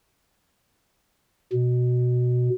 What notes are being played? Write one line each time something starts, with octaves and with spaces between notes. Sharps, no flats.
B2